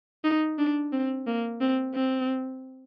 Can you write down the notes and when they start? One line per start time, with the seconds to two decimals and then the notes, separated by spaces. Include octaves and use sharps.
0.24 D#4
0.59 D4
0.93 C4
1.27 A#3
1.61 C4
1.95 C4